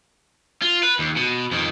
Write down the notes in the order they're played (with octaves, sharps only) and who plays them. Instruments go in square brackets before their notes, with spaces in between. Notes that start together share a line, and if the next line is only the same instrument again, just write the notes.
[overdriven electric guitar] F4
B4
D#2
B2
F2 D#3